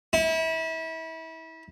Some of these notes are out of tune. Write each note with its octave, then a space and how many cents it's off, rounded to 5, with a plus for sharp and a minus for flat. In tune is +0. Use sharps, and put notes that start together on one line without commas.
E4 -30